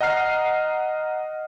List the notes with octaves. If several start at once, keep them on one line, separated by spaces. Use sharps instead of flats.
D#5 F#5 A#5 F6 C7